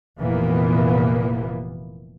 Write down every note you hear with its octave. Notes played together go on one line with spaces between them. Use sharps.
F1 A#2 E3 A#3 B3